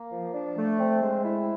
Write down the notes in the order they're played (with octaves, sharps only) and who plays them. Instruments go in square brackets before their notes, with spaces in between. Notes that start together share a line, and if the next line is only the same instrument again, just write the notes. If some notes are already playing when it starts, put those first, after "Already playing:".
Already playing: [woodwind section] A#3
F3
D4
A3
C4
G#3
E4